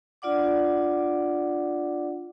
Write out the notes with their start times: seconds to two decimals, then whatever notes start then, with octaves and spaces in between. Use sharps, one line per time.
0.22 D4 F4 D5 F#5 D6